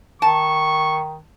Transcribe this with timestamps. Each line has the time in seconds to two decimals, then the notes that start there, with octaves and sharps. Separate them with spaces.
0.22 D#3 A5 C#6